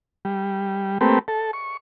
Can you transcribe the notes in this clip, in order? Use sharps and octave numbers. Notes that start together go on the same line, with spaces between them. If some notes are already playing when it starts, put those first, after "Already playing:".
G3
A3 A#3 C4 G4 B4
A4
C#6